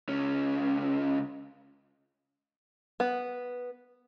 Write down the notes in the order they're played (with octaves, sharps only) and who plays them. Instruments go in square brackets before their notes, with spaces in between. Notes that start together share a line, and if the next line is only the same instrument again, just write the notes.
[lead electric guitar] C#2 C#4
[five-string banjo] B3